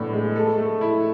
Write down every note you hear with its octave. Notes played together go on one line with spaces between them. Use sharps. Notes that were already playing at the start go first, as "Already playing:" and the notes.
Already playing: A2 B3 D4
G#3
A4
A3
E4